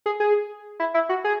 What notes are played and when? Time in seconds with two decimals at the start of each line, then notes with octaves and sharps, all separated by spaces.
0.06 G#4
0.20 G#4
0.80 E4
0.94 E4
1.09 F#4
1.24 G#4